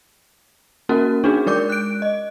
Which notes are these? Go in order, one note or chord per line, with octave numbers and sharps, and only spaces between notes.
A#3 C#4 F#4 A#4
D4 D#4 F#4 G#4
G#3 A#4 D5 D6 G6
F#6 D7
D#5